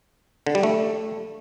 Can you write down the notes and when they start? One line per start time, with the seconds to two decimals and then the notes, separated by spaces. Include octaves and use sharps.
0.47 D3
0.55 G3
0.63 A3